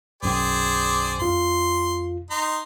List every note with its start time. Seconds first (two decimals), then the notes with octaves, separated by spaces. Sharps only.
0.23 B1 F#2 G#4 C5 D5 G5
1.20 F2 F4 C6
2.31 D#4 A#5 C6